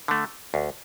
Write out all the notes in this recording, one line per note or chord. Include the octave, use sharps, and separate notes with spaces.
D3 A3
D2